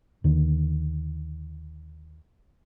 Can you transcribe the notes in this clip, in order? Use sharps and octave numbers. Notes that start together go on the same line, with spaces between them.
D#2 D3 D#3